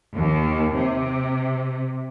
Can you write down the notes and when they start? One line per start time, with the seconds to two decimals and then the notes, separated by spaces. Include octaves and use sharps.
0.16 D#2
0.77 C3